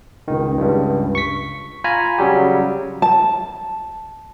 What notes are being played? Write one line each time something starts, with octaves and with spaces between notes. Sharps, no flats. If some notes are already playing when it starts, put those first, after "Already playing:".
C#2 D#3
C#2 G2
C#6 B6
F4 G#5 A#5 B5
C#3 F#3 G3 G4
A5